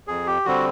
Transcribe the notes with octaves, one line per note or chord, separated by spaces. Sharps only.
F2 G#4
G4
D3 G3 C4 F#4